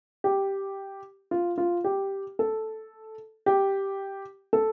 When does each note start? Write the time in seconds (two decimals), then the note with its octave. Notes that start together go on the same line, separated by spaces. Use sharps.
0.24 G4
1.31 F4
1.58 F4
1.84 G4
2.39 A4
3.46 G4
4.53 A4